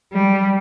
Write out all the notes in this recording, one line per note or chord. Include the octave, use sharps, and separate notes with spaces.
G3